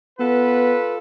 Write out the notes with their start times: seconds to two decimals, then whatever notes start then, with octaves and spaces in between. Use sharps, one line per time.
0.20 B3 F4 A4 B4